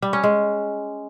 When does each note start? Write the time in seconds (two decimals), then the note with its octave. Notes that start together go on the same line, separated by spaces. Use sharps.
0.02 G3
0.13 C#4
0.23 G#3